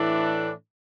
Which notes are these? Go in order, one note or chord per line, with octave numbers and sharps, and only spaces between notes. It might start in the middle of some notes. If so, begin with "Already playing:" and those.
Already playing: A2 E3 A3 D4